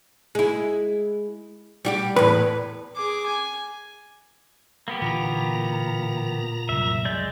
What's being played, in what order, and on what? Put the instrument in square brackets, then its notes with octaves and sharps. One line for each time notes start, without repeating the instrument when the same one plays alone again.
[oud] G#3 E4
G3 F#4 G4
[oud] E2 A2 [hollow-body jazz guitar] B4
[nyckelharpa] G#4 D6
G#5
[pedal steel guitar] A#3 B3 G4
[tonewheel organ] A#2 A#5 [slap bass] D3 E3
[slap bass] C2 F#2 [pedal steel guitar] E5
[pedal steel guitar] G#3 D5 G6